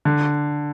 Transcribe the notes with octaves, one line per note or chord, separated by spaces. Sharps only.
D3